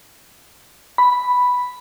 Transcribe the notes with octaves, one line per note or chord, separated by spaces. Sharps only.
B5